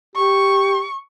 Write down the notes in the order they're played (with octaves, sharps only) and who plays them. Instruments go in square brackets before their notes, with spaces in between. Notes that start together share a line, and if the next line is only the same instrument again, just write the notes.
[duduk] G4 [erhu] C#6